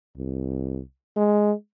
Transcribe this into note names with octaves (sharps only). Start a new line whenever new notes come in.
C2
G#3